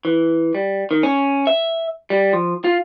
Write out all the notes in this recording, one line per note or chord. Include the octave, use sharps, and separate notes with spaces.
E3
G3
D#3
C#4
E5
G3
F3
F4